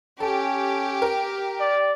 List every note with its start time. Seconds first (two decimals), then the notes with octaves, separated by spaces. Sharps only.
0.20 C#4 G4 A4
1.02 A#4
1.60 D5